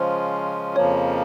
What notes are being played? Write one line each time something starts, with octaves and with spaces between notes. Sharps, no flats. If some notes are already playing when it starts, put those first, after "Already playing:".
Already playing: C#3 F3 G#3 C#4 F4 C5
F2 C#3 F3 A#3 C#5